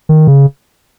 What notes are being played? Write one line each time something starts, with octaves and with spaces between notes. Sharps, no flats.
D#3
C#3